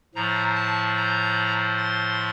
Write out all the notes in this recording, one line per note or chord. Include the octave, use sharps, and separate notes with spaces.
A2 F3 A#5
A5
A#5
C6